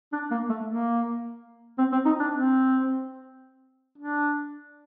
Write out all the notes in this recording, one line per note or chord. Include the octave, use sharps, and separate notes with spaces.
D4
A#3
A3
A#3
C4
C4
D#4
D4
C4
D4